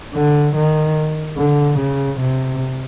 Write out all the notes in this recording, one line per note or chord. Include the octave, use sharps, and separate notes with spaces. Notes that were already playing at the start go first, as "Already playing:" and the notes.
D3
D#3
D3
C#3
C3